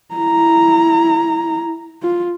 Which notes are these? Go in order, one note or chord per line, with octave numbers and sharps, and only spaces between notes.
E4 A#5
F4